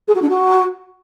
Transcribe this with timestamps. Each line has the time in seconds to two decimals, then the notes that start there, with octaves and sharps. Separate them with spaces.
0.08 G#4
0.15 F#4
0.22 D4
0.29 F#4